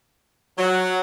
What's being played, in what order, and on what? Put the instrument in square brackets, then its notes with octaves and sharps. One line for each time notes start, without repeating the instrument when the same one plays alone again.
[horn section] F#3